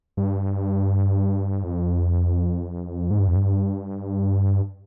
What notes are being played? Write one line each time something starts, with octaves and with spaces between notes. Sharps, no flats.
G2
F2
G#2
G2
F2
G2